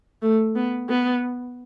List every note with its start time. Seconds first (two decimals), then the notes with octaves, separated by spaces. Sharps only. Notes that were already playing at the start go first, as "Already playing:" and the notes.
0.22 A3
0.56 B3
0.89 B3